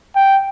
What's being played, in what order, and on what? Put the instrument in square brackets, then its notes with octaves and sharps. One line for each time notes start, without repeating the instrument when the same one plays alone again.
[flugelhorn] G5